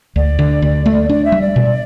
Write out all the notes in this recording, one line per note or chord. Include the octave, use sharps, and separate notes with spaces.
D2 D5
D3
D2
A3
D4 D5
E5
G3
D5
B2